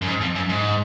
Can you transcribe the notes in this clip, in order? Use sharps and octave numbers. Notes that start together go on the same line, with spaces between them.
F#2
G#2
F2
F#2
G#2